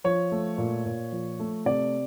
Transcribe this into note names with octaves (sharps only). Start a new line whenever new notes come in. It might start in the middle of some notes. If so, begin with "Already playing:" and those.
F3 C#5
A3
A#2
A#2
F3
A3
C3 D5